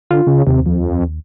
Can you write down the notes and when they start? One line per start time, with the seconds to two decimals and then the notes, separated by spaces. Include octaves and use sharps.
0.11 D3 F4
0.27 C#3
0.47 D#2 C3
0.66 F2